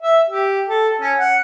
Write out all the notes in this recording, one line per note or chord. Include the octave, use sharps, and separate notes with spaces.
E5
G4
A4
C#4
F#5